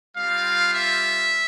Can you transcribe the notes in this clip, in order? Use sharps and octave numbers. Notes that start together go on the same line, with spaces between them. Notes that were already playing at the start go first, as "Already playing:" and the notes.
G3 C4 F4 F5
E5